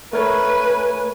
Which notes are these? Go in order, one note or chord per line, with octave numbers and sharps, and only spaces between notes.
A3 A#4 B4 C#5 G#5